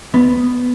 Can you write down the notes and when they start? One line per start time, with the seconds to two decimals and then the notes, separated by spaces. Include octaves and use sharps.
0.14 D2 B3